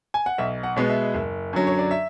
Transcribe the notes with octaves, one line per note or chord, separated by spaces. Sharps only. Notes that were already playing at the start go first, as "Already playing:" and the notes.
G#5
F#5
B1 E5
F#5
B2 G#3 B3
E5
F#1
F#2 D3 F#3
C#5
D5
E5